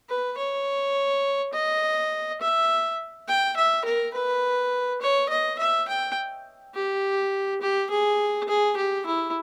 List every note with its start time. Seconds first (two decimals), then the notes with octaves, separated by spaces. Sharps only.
0.09 B4
0.38 C#5
1.53 D#5
2.41 E5
3.28 G5
3.57 E5
3.85 A#4
4.14 B4
5.02 C#5
5.29 D#5
5.59 E5
5.88 G5
6.75 G4
7.61 G4
7.90 G#4
8.48 G#4
8.77 G4
9.06 E4